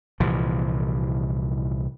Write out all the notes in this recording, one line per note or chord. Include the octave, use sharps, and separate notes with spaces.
C2 A#2 E3 F3